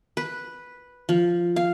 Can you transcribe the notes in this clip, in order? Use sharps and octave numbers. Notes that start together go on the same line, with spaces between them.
B4
F3
F5